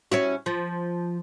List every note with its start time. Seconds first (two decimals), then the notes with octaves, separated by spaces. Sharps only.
0.12 C#4 E4 F#4
0.46 F3